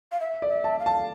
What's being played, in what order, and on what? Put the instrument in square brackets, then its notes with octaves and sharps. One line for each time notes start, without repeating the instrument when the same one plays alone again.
[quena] F5
E5
[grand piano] D5
[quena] E5
[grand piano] A5
[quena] F5
[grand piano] A5